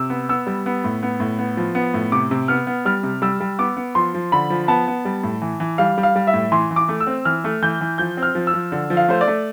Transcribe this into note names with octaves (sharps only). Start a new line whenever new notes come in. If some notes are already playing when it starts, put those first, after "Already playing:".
Already playing: C3 E6
B3
B3 E6
G3
B3
A2
B3
A2
B3
F3
B3
A2
C3 D6
C3
B3 F6
B3
G3 F6
C3
G3 E6
G3
B3 D6
B3
F3 C6
F3
D3 B5
F3
B3 A5
B3
G3
A2
E3
E3
G3 F5
G3
F5
G3
E5
A2
E3 C6
E3
D6
A3
E6
C4
E3 F6
A3
E3 G6
E3
F3 G6
C4
F6
F3
E6
F3
D3
F3
F5
A3 C5
D5
A3